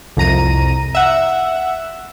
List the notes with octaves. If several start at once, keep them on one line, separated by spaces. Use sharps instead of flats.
C2 F2 A#5 D#7
E5 F#5